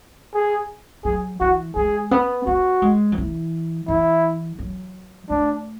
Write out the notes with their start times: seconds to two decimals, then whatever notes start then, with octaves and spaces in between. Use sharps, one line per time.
0.34 G#4
1.05 F#3 G#4
1.40 E3 F#4
1.76 G#3 G#4
2.11 B3
2.47 B3 F#4
2.82 G#3
3.12 F#3
3.18 E3
3.88 E3 E4
4.59 F#3
5.30 A3 D4